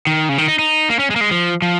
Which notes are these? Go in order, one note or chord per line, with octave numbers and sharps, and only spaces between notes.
D#3
C#3
D#3
D#4
D#4
A#3
C#4
G#3
A#3
G#3
F3
F3